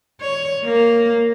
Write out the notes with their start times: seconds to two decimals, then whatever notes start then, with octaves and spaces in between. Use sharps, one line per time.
0.21 C#5
0.64 A#3